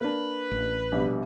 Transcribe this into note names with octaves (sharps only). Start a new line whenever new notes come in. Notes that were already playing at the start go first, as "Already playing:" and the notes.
A#3 D4 B4
A1
A#1 B2 G3